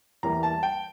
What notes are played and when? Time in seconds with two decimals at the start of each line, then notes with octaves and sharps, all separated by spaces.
0.23 E2 E3 G3 A#3 A#5
0.43 A5
0.63 G5